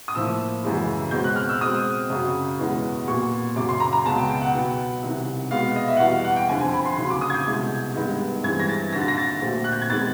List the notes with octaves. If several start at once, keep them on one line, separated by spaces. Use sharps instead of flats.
D#6
A2 F3 A#3 E6
F#2 C#3 E3 G#3
B2 G#3 C4 G6
F#6
F6
E6
B2 G#3 C4 D#6
F#2 C#3 F#3
E2 B2 G#3 B3
A#2 F#3 B3 C#6
F#2 C#3 F#3 D6
C6
A#5
A#5
C#2 B2 G#3 B3 A5
G5
G5
F#5
B2 F#3 B3
C2 C3 D#3
B2 G#3 B3 F5
D#5
E5
F#5
E2 B2 G3 F5
F5
F#5
G5
F2 D3 F3 G#5
G#5
B5
C6
D#2 C#3 F#3 C6
D6
D#6
G#6
G6
C2 B2 G#3
G2 D#3 G#3 B3
G2 E3 G#3 C4 G#6
A#6
A6
D#2 D3 F#3 A#6
A6
A#6
A6
A#2 F#3 A3 C4
F#6
G6
G#6
C3 D#3 G#3 B3 A6